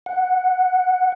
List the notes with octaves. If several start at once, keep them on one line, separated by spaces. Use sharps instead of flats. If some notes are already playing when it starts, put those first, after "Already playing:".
F#5